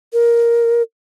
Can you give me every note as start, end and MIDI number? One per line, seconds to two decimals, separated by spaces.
0.13 0.82 70